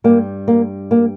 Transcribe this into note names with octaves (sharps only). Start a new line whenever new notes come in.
G2 G3 A#3
A#3
A#3